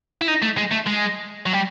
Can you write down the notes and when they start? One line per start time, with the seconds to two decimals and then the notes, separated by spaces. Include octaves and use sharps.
0.22 E4
0.28 D#4
0.42 A3
0.57 G#3
0.72 A3
0.87 G#3
1.46 F#3
1.53 G3